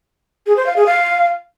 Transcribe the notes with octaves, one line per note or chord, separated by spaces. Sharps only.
G#4
C5
F5
G#4
F5